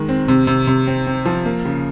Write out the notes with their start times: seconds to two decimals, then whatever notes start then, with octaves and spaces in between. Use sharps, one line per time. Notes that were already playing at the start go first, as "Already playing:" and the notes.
Already playing: D#3 G#3
0.08 C4
0.28 C3
0.47 C3
0.67 C3
0.87 C4
1.06 C4
1.26 F3
1.45 A#3
1.65 C#3